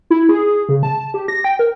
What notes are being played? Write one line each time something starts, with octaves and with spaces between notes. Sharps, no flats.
E4
G#4
C#3
A5
G4
A#6
G5
A#4